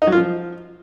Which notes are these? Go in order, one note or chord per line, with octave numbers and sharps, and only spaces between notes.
D#4
F#3
F4
F3